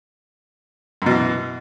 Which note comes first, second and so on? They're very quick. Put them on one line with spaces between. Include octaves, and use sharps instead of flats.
F#2 B2 E3